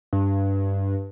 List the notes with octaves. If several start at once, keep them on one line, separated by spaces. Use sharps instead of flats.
G2